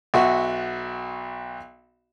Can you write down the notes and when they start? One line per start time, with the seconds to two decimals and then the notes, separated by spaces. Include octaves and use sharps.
0.14 B1 F#4 E5